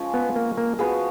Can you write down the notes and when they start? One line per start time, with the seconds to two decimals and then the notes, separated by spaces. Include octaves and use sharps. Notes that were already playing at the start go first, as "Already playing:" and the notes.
Already playing: F3 G#3 C#4
0.14 B3
0.36 A#3
0.57 A#3
0.79 F3 B3 F#4 G#4